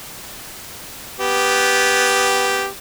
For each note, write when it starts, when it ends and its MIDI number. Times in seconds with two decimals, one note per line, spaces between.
1.19 2.66 59
1.19 2.66 67